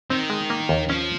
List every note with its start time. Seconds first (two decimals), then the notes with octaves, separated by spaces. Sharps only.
0.10 D#3 C4
0.30 G#3
0.50 A#3
0.69 D#2
0.89 F3 C#4